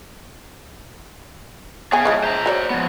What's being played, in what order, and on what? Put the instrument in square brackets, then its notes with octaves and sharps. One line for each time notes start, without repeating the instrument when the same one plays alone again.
[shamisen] B3 E5 G#5 [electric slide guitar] G#4 C#5 F5
[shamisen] F3 G#3 E4
[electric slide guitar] C5 A#5
[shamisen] F#3 C#5 D5
[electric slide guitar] F3 B3